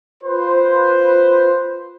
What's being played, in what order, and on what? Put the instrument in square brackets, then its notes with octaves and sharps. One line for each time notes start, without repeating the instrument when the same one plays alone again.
[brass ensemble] F4 B4 C5